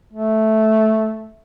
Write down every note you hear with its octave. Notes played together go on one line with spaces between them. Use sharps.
A3